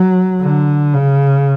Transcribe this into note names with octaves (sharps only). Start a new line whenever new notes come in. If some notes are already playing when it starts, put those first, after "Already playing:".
Already playing: F#3
D3
C#3